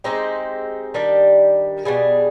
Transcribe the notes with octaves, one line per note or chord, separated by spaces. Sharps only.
G#3 C4 D#4 G4
D#3 G3 D4 G4
B2 G3 D4 G#4